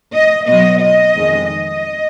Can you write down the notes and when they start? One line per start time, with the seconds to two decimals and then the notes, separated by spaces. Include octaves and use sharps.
0.13 D#5
0.47 B2 F#3 D#5
0.81 D#5
1.14 F2 D#3 G#3
1.47 D#5